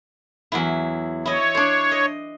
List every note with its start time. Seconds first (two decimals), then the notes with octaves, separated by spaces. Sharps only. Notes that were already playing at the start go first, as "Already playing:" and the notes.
0.52 E2 F#3 E4
1.26 E4 C#5 D#5
1.55 D4 C5
1.91 D#5